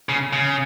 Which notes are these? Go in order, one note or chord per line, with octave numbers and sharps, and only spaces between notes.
C#3
C#3